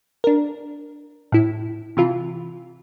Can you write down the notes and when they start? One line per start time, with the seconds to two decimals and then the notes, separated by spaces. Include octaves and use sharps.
0.24 D4 A#4
1.32 A2 E4
1.97 C3 E3 F4